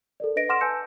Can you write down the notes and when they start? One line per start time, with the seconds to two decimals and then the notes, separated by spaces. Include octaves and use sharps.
0.20 A4 A#4 D5
0.36 D4 B4 D#5 A#6 D7
0.49 F#5 C6 D6 F6 A#6 E7
0.61 B4 G#5 A5 E6 G6 C#7